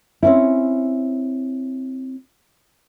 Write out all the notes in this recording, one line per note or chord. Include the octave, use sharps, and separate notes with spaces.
C4 C#4 E4